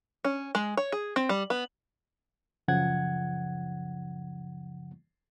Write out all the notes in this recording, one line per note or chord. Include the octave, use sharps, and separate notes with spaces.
C#4
G#3
C#5
G#4
C4
G3
B3
C#2 F#2 C#3 F3 F#5 G#6